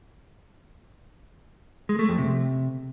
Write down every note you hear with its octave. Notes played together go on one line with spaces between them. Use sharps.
G#3
A3
F2
C3